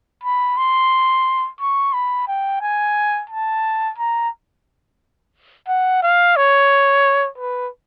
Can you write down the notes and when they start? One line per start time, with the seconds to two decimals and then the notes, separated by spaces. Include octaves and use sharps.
0.24 B5
0.57 C6
1.60 C#6
1.93 B5
2.28 G5
2.62 G#5
3.30 A5
3.98 A#5
5.68 F#5
6.03 F5
6.36 C#5
7.38 B4